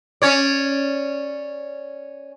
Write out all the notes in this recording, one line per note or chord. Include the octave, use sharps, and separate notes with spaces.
C#4 C#5 D5